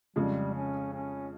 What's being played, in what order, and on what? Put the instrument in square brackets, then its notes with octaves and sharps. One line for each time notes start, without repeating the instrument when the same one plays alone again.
[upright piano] F2 C#3 F3 G#3 [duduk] G3
[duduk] C#4
C#4